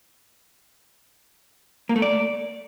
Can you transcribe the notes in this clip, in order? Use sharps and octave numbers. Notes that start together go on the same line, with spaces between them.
A#3
A3
D5